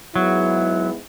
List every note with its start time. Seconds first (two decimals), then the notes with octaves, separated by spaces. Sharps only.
0.15 G#2 F#3 G#3 B3 E4